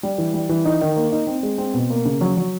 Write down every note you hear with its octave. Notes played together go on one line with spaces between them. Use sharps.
G3
E3
G3
E3
D#4
D#3
A#3
D#4
C4
G#3
C4
B2
A#3
C#3
F#3
F#3